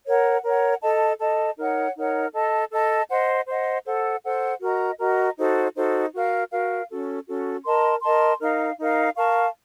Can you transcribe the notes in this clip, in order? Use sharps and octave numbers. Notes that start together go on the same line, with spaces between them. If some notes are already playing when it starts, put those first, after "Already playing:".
A#4 C#5 F#5
A#4 C#5 F#5
A4 D#5 A5
A4 D#5 A5
D#4 A#4 C#5 F#5
D#4 A#4 C#5 F#5
A4 D#5 A5
A4 D#5 A5
C5 D#5 F#5
C5 D#5 F#5
A4 C5 F#5
A4 C5 F#5
F#4 A#4 D#5 A#5
F#4 A#4 D#5 A#5
D#4 F#4 A4 C5
D#4 F#4 A4 C5
F#4 A#4 F5
F#4 A#4 F5
C#4 F#4 A4
C#4 F#4 A4
A#4 D#5 A5 C6
A#4 D#5 A5 C6
D#4 A#4 F5
D#4 A#4 F5
A#4 F5 A5 C#6